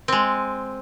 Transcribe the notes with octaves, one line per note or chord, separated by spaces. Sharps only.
G#3 C4